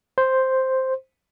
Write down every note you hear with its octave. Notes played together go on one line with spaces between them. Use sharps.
C5